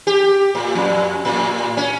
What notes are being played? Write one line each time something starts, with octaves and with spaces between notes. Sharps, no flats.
G4
A2
F2
A2
C#4